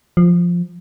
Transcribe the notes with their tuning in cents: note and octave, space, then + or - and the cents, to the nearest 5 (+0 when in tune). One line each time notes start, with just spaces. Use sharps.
F3 +0